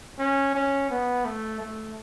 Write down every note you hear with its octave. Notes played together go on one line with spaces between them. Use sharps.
C#4
C#4
B3
A3
A3